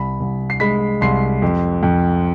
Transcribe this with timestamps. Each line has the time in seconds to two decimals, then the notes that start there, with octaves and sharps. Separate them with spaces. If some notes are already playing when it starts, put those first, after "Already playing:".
Already playing: C2 B5
0.20 C2
0.50 C7
0.60 G#3 B5 B6
1.01 C2 C6 C7
1.42 F2
1.83 F2